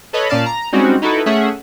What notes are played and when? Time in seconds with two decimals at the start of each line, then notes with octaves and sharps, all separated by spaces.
0.13 A4 B4 C#5 D#5 B5
0.29 A#2 C#4 D5 F5 A5
0.46 A#5
0.72 G3 G#3 C4 C#4 D#4 F#4
1.02 D#4 E4 F#4 A4 B4
1.26 A3 C#4 G#4 E5 F#5